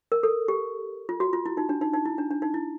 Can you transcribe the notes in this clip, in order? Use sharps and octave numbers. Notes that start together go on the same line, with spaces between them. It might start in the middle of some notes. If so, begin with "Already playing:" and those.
A#4
A4
G4
F4
F#4
F4
E4
D#4
D4
D#4
D#4
E4
D4
D4
D#4
E4